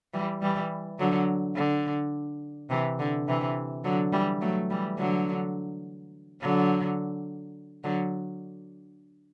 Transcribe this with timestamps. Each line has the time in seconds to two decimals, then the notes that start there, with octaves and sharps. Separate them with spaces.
0.14 E3 G3
0.42 E3 G3
0.99 D3 F#3
1.56 D3
2.70 C3 E3
2.99 D3
3.28 C3 E3
3.84 D3 F#3
4.13 E3 G3
4.41 F#3 A3
4.70 E3 G3
4.98 D3 F#3
6.41 D3 F#3
7.84 D3 F#3